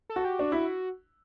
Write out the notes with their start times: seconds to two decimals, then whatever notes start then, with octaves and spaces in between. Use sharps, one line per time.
0.10 A4
0.16 F#4
0.25 G4
0.39 D4 F#4
0.52 E4